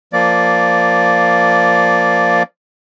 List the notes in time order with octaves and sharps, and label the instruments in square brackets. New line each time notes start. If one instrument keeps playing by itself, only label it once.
[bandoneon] F3 A#3 D5